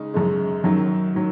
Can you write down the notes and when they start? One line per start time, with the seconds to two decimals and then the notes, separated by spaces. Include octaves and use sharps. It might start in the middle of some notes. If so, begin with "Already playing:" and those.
Already playing: C#3 G#3 D#4
0.14 F#2 C#3 G#3
0.64 F#2 D#3 F#3
1.15 D#3 F#3